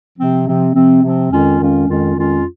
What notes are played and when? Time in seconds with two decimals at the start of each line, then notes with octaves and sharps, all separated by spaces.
0.18 C3 F3 C4
0.46 C3 F3 C4
0.74 C3 F3 C4
1.03 C3 F3 C4
1.31 F2 D#3 G#3 C#4 F4
1.59 F2 D#3 G#3 C#4 F4
1.87 F2 D#3 G#3 C#4 F4
2.15 F2 D#3 G#3 C#4 F4